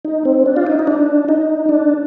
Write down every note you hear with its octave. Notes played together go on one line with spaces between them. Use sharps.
D#4
C4
D4
F4
D#4
D#4
D4
D#4
D4